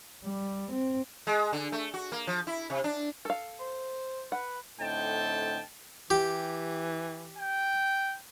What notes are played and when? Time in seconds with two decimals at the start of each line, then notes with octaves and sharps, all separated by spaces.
0.23 G3
0.72 C4
1.27 G#3
1.53 D3
1.72 A3
1.94 F#4
2.12 A#3
2.27 F3
2.47 E4
2.70 C3
2.84 D4
3.25 A4 F5
3.60 C5
4.32 B4 F#5
4.80 A2 D3 C4 D#4 G5 A5
6.10 E3 G4
7.38 G5